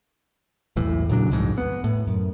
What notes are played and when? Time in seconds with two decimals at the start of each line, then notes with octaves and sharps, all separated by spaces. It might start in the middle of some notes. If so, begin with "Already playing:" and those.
0.76 E1 B1 A2 E3
1.09 A#2 C#3 F#3 D4
1.30 C2 F2 G#2
1.58 B3
1.84 A2
2.07 F#2